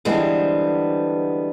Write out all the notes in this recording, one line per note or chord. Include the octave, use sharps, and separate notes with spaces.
D3 E3 G3 G#3 B3 C5